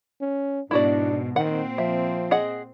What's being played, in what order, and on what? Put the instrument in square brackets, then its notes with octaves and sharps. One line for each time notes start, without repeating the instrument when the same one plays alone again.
[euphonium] C#4
[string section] G#2 B2 [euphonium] D4 [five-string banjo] E4 F#4 D5
[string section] A#2 C4 [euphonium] D#3 [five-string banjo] F#5
[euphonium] F3 [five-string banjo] E5
[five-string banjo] G#4 D#5 F#5